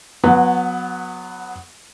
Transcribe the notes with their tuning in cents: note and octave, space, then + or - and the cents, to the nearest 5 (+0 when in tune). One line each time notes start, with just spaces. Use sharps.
F#3 -25 B3 +0